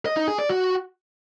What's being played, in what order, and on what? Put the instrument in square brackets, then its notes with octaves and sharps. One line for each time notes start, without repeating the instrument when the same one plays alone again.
[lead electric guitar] D#5
D#4
G#4
D5
F#4